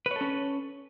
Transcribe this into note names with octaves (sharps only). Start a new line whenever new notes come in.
C#4 A4 B4 C#5